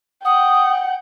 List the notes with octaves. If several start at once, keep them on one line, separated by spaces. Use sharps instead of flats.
F#5 G5 D#6